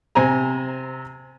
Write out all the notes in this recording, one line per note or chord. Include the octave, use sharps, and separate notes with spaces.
C3 C5 G#5 A#5